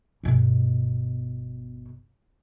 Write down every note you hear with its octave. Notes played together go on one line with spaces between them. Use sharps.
G1 B2